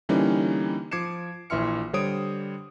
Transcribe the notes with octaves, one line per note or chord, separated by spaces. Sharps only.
D3 E3 G3 A#3 C#4 D#4
F3 D6 G#6 C7 C#7 E7
A#1 E3 E5 C6 F6 C#7
D3 G3 C5 C#5 D#6 D7